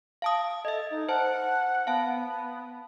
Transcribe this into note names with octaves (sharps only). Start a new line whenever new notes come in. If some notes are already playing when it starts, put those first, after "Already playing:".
F5 A5 D#6
A4 D#5 E5
D#4
C5 F#5 A5
B3 F5 A5